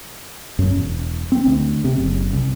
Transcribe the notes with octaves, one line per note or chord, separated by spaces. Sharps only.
F#2
E1
C4
D2
C3
F#1
C2